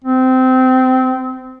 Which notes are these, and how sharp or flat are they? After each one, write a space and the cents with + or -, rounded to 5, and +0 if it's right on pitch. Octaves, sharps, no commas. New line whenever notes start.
C4 -20